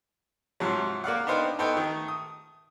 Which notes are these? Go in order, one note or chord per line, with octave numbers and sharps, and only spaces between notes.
G#2 C3 F3 F#3
A#3 D5 F5 F#5
B3 D4 D#4 C5 F5 G5
A3 B3 D#4 A4 C5 G5
D#3 A3
D#6